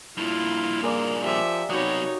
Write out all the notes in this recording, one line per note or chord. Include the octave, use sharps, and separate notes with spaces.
G2 A#2 E4 F4
A#3 G#4 D5 F5
F3 A#3 G4 E5
C3 F#3 G3 B3 D#4 F#4 C#5 D#6